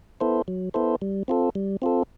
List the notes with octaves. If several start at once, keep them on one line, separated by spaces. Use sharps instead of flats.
B3 E4 A4 C5
F#3
B3 E4 A4 C5
G3
C4 F4 A4
G3
C4 F4 A4